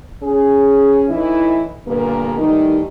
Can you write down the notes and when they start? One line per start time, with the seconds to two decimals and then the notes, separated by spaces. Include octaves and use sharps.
0.21 C#4 G#4
1.08 A2 E3 D#4 E4
1.86 G2 A#2 D3 A#3 B3 A#4
2.37 D#3 E3 G3 A3 D#4